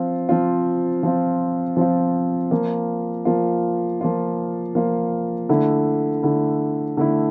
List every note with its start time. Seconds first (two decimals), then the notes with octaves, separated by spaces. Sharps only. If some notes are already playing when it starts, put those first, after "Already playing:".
Already playing: F3 C4 F4
0.29 F3 C4 F4
1.03 F3 C4 F4
1.77 F3 C4 F4
2.51 F3 A#3 F4
3.25 F3 A#3 F4
4.01 F3 A#3 F4
4.75 F3 A#3 F4
5.49 D3 A3 E4
6.23 D3 A3 E4
6.97 D3 A3 E4